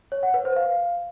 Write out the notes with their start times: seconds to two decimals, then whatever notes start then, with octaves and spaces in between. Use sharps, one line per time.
0.12 C#5
0.23 F#5
0.34 B4
0.45 C5
0.56 F5